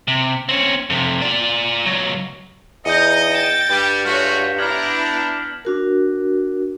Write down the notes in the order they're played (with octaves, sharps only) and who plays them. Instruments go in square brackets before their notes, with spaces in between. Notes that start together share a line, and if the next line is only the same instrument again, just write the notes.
[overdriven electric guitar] C3
C4 C#4
F2 C3
F4 D5
C#2 F#3
[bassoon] E2 [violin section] D#4 [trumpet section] D#5 [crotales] G6 C#7
[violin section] G5 A6 [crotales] A#6 E7
[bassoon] G2 [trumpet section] G3
[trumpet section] G#3 A3 F#4 [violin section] F4 C#5 [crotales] F6 B6
[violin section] B3 E4 A#5 [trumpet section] D4 [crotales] F6 G#6 F#7
[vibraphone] D4 F#4 A#4